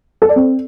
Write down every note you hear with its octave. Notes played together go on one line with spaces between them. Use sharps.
A4
D5
C4